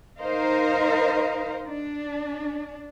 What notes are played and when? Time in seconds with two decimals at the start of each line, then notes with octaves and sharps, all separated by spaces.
0.19 D#4 A#4 C5 D#5 F5
1.66 D4